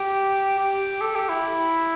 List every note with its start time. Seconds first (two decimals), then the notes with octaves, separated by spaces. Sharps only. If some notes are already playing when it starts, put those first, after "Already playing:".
Already playing: G4
0.59 G4
1.01 A4
1.15 G4
1.29 E4